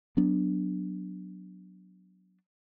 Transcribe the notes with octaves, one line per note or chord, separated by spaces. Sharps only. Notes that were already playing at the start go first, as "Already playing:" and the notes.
F#3 B3 D4